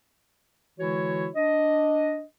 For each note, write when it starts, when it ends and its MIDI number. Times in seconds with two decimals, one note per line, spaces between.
0.79 1.29 50
0.79 1.29 52
0.79 1.29 56
0.79 1.29 64
0.79 1.29 66
0.79 1.29 73
1.35 2.23 62
1.35 2.23 75